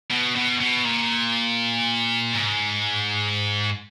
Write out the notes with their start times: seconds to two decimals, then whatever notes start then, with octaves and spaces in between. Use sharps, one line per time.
0.10 B2
0.35 B2
0.60 B2
0.85 A#2
2.33 G#2